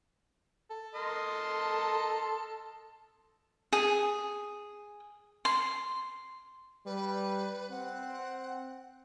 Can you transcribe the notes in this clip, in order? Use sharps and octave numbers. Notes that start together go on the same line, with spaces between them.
A4
A#4 D#5 C6
G#4
C6
G3 B4
C4 F#5